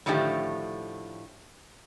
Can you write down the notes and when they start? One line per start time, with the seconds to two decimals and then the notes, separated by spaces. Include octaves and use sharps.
0.06 A2 D3 D#3 F3 A3 G4